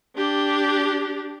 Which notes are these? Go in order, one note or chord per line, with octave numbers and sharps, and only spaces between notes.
D4 G4